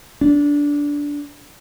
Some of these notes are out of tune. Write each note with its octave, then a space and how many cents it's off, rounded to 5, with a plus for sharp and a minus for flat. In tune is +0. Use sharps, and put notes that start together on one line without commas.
D4 -15